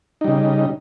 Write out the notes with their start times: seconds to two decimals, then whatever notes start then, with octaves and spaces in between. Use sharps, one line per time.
0.21 D#4
0.24 G3
0.28 C#3